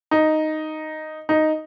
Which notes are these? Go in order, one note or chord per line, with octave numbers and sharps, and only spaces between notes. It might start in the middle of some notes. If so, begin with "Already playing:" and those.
D#4
D#4